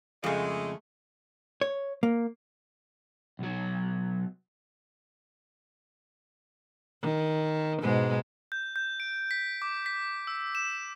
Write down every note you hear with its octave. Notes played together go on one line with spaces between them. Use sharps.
F2 C#3 G#3 A3
C#5
A#3
B1 F#3
D#3
G#2 B2 G#3
G6
G6
D7
B6
D6
B6
E6
E7